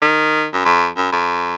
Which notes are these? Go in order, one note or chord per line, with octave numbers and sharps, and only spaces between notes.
D#3
F#2
F2
F#2
F2